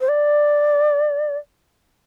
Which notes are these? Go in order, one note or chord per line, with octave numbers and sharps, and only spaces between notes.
C5
D5